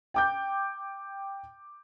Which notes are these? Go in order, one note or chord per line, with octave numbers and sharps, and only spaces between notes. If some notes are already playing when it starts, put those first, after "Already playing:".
G5 D6 G6